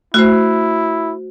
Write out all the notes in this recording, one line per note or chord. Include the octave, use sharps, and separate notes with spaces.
A3 E4 F#4 C5